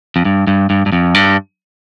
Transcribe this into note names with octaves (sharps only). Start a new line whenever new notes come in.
F2
G2
G2
G2
G2
F2
G2